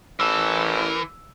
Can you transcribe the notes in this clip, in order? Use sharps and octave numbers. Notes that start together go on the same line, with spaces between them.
A1 E3 A#4 A5 E6